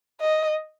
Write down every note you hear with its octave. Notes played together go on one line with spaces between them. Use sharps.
D#5